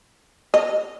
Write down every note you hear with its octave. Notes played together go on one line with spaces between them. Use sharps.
D#5